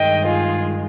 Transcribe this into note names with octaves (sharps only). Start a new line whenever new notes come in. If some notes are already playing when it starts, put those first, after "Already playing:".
Already playing: G2 D#3 G#3 D#5 G5
F4 G#4